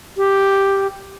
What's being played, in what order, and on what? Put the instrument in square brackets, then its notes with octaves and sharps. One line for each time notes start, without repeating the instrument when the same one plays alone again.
[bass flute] G4